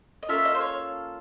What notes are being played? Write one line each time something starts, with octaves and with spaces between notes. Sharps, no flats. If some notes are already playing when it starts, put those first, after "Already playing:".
D#5
A#3 C#4 F4 A4 E5
D#5
C5
C#5